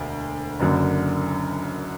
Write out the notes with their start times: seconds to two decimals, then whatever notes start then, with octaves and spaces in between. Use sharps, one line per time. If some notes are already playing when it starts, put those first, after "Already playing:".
Already playing: E1 D2
0.60 F#1 F#2 D3